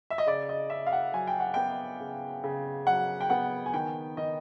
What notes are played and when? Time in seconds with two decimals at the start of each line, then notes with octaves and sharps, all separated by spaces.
0.10 E5
0.18 D#5
0.26 C#3 D5
0.49 D#5
0.70 C#3 E5
0.87 F5
0.93 F#5
1.14 F#3 G#5
1.27 G5
1.40 F#5
1.54 B3 G5
2.00 C#3
2.44 C#3
2.87 F#3 F#5
3.20 G5
3.30 B3 F#5
3.66 G#5
3.74 D#3 G5
4.17 D#3 D#5